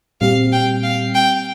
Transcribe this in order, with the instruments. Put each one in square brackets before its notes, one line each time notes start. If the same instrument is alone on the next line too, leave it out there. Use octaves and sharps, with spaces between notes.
[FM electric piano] A#2 G3 C4 G4 [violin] F5
[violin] G5
F5
G5